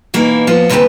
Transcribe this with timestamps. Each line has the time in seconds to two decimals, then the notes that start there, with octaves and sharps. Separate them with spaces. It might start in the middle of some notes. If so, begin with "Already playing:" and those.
0.14 B2 E3 A#3 D#4 E4
0.47 F3 B3 F4
0.70 D#2 C#3 G#3 C4 G4 B4